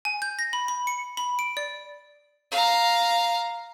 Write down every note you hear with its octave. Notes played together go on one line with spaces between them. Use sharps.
G#5
G6
A#6
B5
B5
C#7
B5
D7
D5
F5 A#5